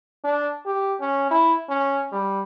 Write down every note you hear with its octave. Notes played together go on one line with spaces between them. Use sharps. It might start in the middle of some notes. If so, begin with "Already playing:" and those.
D4
G4
C#4
E4
C#4
G3